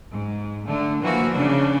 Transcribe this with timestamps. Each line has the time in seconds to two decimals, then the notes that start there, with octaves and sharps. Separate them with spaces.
0.10 G#2
0.67 D3 A3
1.02 E3 F3 A#3 F#4
1.32 C#3 D4